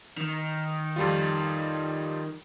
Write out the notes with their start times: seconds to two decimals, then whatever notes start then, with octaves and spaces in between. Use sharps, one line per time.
0.17 D#3
0.96 F2 G3 F4